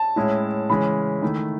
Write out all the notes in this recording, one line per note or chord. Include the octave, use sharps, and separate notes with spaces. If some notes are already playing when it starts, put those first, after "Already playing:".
Already playing: A5
A2 G#3 C#4 E4
C#3 E3 G#3 C#4 B5
D#3 A3 E4